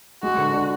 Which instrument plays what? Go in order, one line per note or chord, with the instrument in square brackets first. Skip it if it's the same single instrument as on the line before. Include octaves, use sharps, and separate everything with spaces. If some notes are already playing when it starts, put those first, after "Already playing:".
[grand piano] G#3 [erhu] F#4
[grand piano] D3
D4